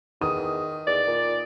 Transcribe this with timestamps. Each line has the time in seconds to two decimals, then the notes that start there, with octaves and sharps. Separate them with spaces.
0.21 E2 D#3 D#6
0.87 E2 D5
1.07 A#2